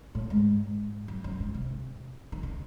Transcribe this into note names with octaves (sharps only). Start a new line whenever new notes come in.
A2
G#2
F#2
F#2
G#2
C3
D#3
C#3